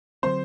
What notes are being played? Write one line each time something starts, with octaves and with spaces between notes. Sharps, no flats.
D3 F#3 A3 C4 C5